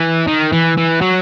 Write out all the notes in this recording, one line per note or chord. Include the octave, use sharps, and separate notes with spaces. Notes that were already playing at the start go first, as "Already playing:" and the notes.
Already playing: E3
D#3
E3
E3
F#3